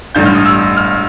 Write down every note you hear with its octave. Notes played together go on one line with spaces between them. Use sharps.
A1 G2 D3 G6
F6
D#6
E6
F6